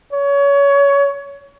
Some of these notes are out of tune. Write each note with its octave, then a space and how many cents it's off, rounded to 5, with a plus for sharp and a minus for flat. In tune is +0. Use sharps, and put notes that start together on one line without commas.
C#5 +25